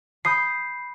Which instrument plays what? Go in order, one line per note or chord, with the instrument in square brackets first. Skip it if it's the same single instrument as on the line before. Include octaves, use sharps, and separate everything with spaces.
[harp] B5 D#6 G6 [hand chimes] C7